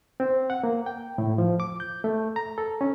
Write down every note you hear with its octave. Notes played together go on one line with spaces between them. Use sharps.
C4
F#5
A#3
G5
A2
F3
D6
G6
A3
A#5
A4
C#4